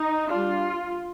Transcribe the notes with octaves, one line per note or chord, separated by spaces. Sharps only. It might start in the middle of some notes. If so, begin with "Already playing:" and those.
Already playing: D#4
G3 D4 F4